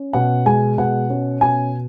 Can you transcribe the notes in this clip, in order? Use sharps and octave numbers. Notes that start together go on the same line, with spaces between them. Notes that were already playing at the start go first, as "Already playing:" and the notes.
Already playing: C#4
B2 F#5
G#3 G#5
B2 F#5
C#4
B2 G#5